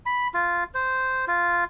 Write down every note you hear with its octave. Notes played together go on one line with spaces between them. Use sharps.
B5
F4
C5
F4